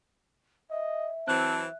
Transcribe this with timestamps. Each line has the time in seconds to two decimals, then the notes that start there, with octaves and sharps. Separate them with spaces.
0.71 D#5 E5
1.28 E3 F#3 C4 A5 F#6